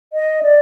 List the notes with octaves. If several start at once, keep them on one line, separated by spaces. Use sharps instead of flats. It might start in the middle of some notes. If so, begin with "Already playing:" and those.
D#5
D5